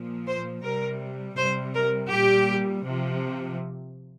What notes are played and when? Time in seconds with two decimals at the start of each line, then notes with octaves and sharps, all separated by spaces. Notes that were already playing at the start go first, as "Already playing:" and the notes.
Already playing: A#2 F3
0.27 C5
0.64 C3 G3 A#4
1.37 C3 G3 C5
1.73 A#4
2.10 A#2 G3 G4
2.84 C3 F3